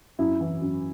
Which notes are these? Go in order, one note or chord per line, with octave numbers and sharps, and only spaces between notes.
F#2 E4
E3
F#2